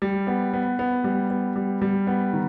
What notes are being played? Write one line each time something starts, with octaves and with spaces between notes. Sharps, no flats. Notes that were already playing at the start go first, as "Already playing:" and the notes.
G3
B3
B3
B3
G3
B3
G3
G3
B3
D#3